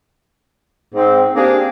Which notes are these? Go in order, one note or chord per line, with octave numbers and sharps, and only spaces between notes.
G#2 C4
A#3 C4 D4 G4 G#4